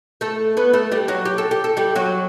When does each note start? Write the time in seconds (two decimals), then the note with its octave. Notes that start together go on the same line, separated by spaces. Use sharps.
0.21 A3 A4
0.57 B3 B4
0.73 A3 A4
0.92 G3 G4
1.08 F#3 F#4
1.25 G4
1.38 A4
1.51 G4
1.64 A4
1.77 G3 G4
1.95 F#3 F#4